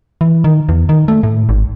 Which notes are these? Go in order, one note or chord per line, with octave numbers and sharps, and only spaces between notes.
E3
D#3
E2
D#3
A3
A2
G#1